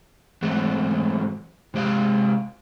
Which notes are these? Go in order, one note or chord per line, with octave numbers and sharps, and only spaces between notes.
G#2 E3 F#3 A3 C4 F#4
C3 G#3 G4 C5 F5